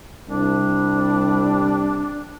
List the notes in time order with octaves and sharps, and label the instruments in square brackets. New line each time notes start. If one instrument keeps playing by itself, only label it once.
[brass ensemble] C2 G3 [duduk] D4